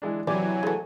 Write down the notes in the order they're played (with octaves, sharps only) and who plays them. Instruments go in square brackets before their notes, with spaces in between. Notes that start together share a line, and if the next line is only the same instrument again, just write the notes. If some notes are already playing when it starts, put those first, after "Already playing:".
[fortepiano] E3 G#3 D4
[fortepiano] C3 G4 [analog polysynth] E3 F#3 [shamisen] D5 [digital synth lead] G#5
[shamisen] G#3 A3